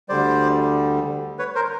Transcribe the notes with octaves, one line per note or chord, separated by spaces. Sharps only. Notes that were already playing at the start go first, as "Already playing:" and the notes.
D2 D3 G3 C5 D5
B4 C#5
A#4 C5